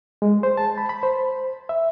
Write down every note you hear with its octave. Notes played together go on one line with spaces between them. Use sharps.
G#3
C5
A5
B5
B5
C5
E5